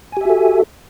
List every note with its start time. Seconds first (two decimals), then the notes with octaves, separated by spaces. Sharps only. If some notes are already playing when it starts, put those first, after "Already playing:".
0.12 G#5
0.17 G4
0.21 E5
0.25 F#4
0.30 A4